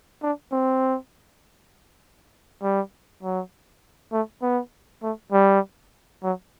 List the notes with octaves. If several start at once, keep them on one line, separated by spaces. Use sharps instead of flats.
D4
C4
G3
F#3
A3
B3
A3
G3
F#3